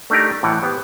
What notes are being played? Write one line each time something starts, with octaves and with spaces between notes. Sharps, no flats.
A3 D4 D#4 G4 A#4
A2 E3 F#5 G5
B3 G4 C5